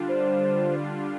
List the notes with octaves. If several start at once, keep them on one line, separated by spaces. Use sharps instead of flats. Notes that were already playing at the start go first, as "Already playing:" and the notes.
Already playing: D3 G3 D4 F4
C5